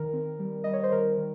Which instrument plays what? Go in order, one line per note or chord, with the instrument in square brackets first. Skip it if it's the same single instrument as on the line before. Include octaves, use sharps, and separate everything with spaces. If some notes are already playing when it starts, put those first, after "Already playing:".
Already playing: [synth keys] D#3 A#4
C4
G3
G3 D#5
C#5
C5
D#3 A#4
D#3